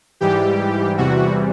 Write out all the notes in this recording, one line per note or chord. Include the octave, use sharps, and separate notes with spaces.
G#2 E3 G3 G4
E2 C3 E3 G3 F#4